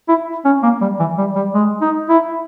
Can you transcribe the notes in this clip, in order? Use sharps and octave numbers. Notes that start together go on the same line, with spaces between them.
E4
C#4
A#3
G3
E3
G3
G3
G#3
D#4
E4